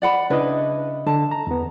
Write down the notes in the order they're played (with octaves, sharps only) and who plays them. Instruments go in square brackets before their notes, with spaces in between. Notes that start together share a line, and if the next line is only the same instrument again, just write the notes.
[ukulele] D5 F#5 B5
[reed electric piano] C#3 D#5 [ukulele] D4 E4 B4
[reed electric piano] D3 [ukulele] A5
[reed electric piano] A#5
E2 B3